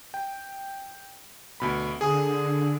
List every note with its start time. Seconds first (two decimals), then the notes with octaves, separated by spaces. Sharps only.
0.14 G5
1.60 D2 B2 B5
2.01 D3 G#4 G#5 D#6